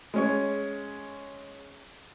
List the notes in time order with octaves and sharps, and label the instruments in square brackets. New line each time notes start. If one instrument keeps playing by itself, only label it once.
[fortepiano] G#3 C#4 C#5